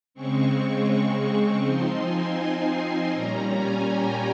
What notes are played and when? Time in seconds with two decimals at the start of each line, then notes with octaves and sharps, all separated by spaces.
0.14 C#3 G#3 C4 C#6
1.64 F3 C4 D#4 C6
2.01 G#5
2.38 G#5
3.13 A#2 G3 C#4 A#5
3.50 G#5
3.87 G5